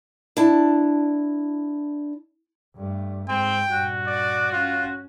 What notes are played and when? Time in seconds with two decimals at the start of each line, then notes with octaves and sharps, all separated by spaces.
0.37 D4 E4 A5
2.76 G2 A3
3.28 G#2 C4 G5
3.71 G2 A#2 F#4
4.07 D5
4.52 C#4 F4